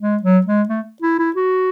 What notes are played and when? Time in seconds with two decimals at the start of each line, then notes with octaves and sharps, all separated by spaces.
0.01 G#3
0.22 F#3
0.46 G#3
0.68 A3
1.02 E4
1.19 E4
1.36 F#4